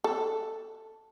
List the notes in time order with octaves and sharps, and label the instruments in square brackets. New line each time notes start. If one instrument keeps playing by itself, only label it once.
[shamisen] A4